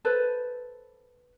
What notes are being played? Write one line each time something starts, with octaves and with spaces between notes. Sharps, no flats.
A4 B4 C5